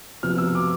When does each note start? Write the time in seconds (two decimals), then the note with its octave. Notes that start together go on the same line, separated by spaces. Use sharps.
0.23 C3 F3 B3 F6
0.38 E6
0.55 D6